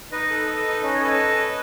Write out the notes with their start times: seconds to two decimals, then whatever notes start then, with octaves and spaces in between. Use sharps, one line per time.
0.12 D#4 B4 D#5
0.30 A4
0.48 A4
0.66 D#4
0.83 C#4 D#5
0.94 C#5
1.01 A4 B4 D#5